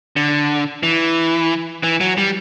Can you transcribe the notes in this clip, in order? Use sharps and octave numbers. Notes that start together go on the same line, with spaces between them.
D3
E3
E3
F#3
G3